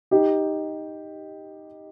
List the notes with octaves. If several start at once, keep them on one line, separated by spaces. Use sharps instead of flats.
D#4 G4